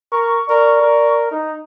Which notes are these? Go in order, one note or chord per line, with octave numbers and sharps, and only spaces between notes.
A#4 C#6
A#4 D5
A#4
D#4